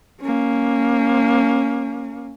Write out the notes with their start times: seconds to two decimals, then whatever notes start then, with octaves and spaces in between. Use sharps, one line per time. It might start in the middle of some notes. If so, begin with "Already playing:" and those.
0.21 A#3 C#4